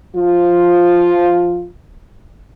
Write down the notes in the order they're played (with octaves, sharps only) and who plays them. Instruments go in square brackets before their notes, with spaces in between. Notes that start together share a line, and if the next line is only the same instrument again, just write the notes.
[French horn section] F3 F4